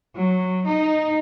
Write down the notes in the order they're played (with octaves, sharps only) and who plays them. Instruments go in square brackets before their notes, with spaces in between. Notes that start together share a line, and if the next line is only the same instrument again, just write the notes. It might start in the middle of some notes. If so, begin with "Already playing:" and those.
[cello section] F#3
D#4